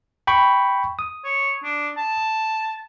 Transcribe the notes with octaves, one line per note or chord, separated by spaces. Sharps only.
G5 B5 C#6
D#6
C#5
D4
A5